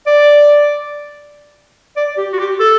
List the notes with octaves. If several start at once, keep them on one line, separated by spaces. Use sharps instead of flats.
D5
D5
G4
F#4
G4
A4